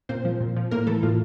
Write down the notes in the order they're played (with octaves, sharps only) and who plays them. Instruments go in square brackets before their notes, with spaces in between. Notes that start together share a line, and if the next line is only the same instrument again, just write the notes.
[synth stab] A#2 C4 C5
F3
A#2
F3
A2 A#3 A#4
E3 A3 A4
A2 F4